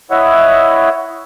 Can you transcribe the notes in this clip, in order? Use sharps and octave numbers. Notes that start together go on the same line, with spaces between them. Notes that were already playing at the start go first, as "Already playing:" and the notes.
E4 C#5 D#5 E5 F#5